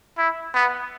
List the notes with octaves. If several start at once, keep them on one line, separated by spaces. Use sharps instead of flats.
E4
B3